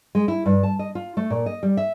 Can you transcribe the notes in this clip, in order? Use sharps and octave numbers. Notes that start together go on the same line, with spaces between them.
G#3
E4
G2
A5
D#5
F4
A3
A#2
D#5
G3
E5